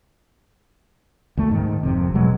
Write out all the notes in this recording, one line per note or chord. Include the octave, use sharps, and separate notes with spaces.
D2 A3
G#2 D#3
F#1 F2 C3
E1 B2 F#3 G#3